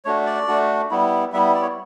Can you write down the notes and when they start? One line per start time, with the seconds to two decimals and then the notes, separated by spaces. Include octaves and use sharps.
0.05 A3 D4 F#4 C#5
0.26 D5
0.48 A3 D4 F#4
0.91 G3 B3 E4
1.33 G3 B3 E4 E5
1.54 D5
1.62 C#5